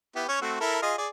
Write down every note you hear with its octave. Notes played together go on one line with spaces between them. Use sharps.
B3 E4 G4
C#4 C#5
A3 C4 F#4
E4 A4 A#4
F4 G#4 D#5
G#4 D5